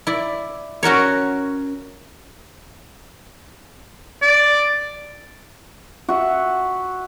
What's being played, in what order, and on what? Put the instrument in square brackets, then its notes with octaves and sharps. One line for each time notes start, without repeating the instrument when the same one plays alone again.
[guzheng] E4 D5
C#4 F#4 A#4 C#5
[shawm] D5
[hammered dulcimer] F#4 E5